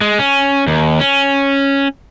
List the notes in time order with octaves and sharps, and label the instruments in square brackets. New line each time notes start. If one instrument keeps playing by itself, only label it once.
[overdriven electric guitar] G#3
C#4
D#2
C#4